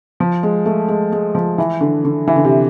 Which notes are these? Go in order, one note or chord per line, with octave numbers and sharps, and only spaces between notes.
F3
G#3
A3
G#3
G#3
F3
E3
D3
D3
E3
D3
C3